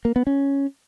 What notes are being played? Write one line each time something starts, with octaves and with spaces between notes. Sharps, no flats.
A#3
B3
C#4